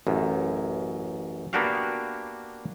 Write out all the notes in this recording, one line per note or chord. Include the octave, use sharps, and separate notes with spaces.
A1 F#2
A#3 B3 D4 F#4 G4 F5